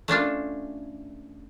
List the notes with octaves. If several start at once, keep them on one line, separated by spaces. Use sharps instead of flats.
A3 C#4 D4 F4